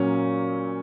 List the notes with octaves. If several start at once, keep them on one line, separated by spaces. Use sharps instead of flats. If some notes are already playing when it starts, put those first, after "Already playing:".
Already playing: A#2 F#3 A#3 C#4